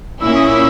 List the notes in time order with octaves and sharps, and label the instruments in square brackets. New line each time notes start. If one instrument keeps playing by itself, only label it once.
[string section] A#2 A#3 C#4 E4 [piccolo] E6
[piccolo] D#6
E6